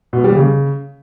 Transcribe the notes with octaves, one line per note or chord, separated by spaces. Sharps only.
B2
G3
C#3